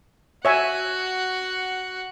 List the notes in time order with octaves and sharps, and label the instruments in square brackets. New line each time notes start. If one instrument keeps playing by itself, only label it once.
[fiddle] F#4 F#5 [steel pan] C#5 E5 G#5